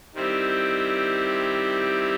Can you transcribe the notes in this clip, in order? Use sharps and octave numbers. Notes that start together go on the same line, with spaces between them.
D#3 G3 C4 E4 G4